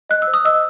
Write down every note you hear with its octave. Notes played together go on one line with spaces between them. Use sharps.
D#5 F#6
E6
C5
D#6
D#5 E6